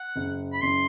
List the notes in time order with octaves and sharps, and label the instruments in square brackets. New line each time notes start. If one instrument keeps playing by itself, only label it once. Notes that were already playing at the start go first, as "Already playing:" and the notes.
Already playing: [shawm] F#5
[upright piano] F#1
[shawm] B5
[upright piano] F#1 [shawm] C6